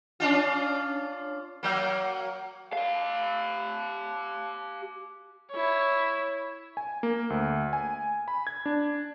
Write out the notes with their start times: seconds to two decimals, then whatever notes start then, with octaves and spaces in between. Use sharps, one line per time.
0.20 C#4 D4 F4
1.63 F#3 A#3
2.73 G4 F5
5.51 E4 C#5
6.77 G#5
7.03 A#3
7.30 D2
7.73 G#5
8.28 B5
8.47 G#6
8.66 D4